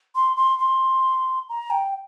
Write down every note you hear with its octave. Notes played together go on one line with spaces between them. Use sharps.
C6
C6
C6
A#5
G5